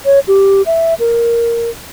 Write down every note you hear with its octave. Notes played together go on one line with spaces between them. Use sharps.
C#5
G4
E5
A#4